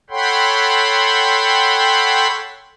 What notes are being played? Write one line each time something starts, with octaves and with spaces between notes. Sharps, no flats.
A4 C#5 F#5 G5 B5 C6